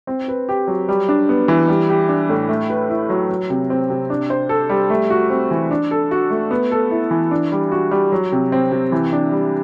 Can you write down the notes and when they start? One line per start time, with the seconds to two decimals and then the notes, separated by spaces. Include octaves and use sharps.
0.07 C4
0.28 B4
0.49 G4
0.68 F#3
0.89 G3
1.09 D4
1.29 B3
1.48 E3
1.68 G3
1.89 G4
2.09 D4
2.29 A2
2.49 A3
2.70 B4
2.89 E4
3.09 F#3
3.29 F#3
3.50 C3
3.70 C4
3.90 C3
4.10 D4
4.30 C5
4.49 A4
4.69 G3
4.90 A3
5.10 F#4
5.30 C4
5.51 E3
5.71 D4
5.91 A4
6.11 F#4
6.30 A3
6.51 B3
6.71 A4
6.91 E4
7.11 E3
7.31 D4
7.52 G3
7.72 F#4
7.91 G3
8.12 F#3
8.32 C3
8.52 C4
8.72 C3
8.92 E3
9.12 D4
9.32 G3